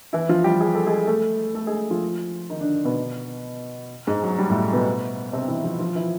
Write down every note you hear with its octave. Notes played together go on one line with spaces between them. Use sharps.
E3 E4
F3 F4
G3 G4
G#4
A4
G#3 G#4
A3 A4
A3 A4
G#3 G#4
F3 F4
D#3 D#4
D3 D4
B2 B3
G#2 G#3
F#3
G3
A2 A3
B2 B3
C3 C4
E3 E4
F3 F4
F3 F4
E3 E4